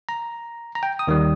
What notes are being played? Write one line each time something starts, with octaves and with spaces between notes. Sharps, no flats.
A#5
A#5
G5
D#6
D#2 D#3 G3